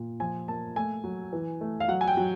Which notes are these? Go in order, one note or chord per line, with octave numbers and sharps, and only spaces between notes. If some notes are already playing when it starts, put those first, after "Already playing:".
Already playing: A#2
F3 G#5
A#3 A5
A3 G#5
F#3
E3
A3
F5
F#3 F#5
G#5
G5
F#3